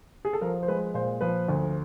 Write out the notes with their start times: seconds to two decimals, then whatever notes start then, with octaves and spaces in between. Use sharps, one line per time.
0.25 G#4
0.33 A4
0.41 F3 A#4
0.63 C5
0.68 G#3 B4
0.94 A#2 C5
1.21 F3 B4
1.48 D2